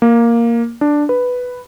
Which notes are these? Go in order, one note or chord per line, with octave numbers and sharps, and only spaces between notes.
A#3
D4
B4